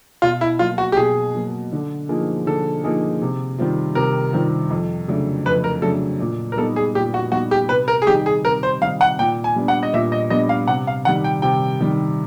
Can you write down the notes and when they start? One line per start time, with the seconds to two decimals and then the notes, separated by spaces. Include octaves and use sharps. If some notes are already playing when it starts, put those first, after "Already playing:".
0.22 B2 F4
0.41 E4
0.59 F#3 A#3 F4
0.78 F#4
0.92 G4
0.97 B2 G#4
1.35 F#3 A#3
1.73 D3
2.09 F3 A#3 D#4 G#4
2.47 D3 A4
2.84 F3 A#3 D#4 G#4
3.22 C3
3.58 D#3 G3 C4 F4
3.95 C3 A#4
4.33 D#3 G3 C4 F4
4.70 F2
5.08 C#3 F#3 A3 D4
5.46 F2 B4
5.64 A#4
5.82 C#3 F#3 A3 D4 A4
6.20 A#2
6.52 A#4
6.57 G3 B3 D#4 A4
6.76 G#4
6.95 A#2 G4
7.14 F#4
7.32 G3 B3 D#4 F#4
7.51 G4
7.69 C3 B4
7.88 A#4
8.02 G#4
8.07 D#3 G3 C4 D#4 G4
8.26 G#4
8.45 C3 A#4
8.63 C5
8.81 D#3 G3 C4 D#4 F5
9.01 F#5
9.19 A#2 G5
9.44 G#5
9.56 G3 B3 D4
9.68 F#5
9.83 D#5
9.93 A#2 E5
10.12 D#5
10.30 G3 B3 D4 D#5
10.49 F5
10.68 C3 F#5
10.87 F5
11.05 D#3 G3 F#5
11.24 G5
11.42 C3 G5
11.81 D#3 G3